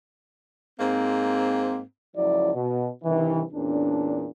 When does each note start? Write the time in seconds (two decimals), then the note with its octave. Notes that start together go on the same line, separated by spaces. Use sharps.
0.78 G#2 A#3 C4
2.17 F#1 C#2 F3 F#3 E4 D5
2.55 B2
3.04 C2 G2 D#3 E3
3.53 E2 A#2 C#4 D4